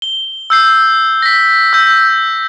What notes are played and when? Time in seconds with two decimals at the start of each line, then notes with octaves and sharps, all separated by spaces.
0.02 G7
0.50 E6 G6 C7
1.22 A#6 B6
1.73 E6 G6